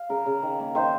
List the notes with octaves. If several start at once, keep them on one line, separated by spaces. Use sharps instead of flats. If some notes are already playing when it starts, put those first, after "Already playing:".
Already playing: F5
C#3 A#4
C#3
D#3
A#3
D#3 C5